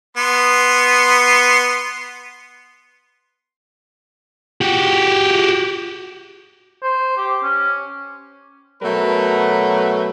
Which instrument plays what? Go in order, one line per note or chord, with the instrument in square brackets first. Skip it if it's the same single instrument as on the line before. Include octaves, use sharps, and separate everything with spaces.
[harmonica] B3 C6
[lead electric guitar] F#4 G4
[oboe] C5
G4
C#4
[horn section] B2 F#3 A3 A#4 B4